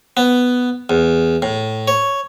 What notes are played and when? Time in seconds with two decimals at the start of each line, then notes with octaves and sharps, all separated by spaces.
0.17 B3
0.90 E2
1.42 A2
1.88 C#5